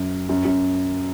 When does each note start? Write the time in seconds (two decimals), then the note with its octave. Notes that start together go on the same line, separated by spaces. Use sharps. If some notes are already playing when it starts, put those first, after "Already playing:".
Already playing: F#2
0.29 F#2
0.45 F#2